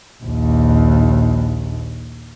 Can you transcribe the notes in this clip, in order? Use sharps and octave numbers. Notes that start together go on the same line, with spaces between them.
A#1 D#2